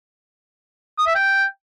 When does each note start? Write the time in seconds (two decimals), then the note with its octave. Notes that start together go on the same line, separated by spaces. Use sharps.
0.98 D#6
1.06 E5
1.15 G5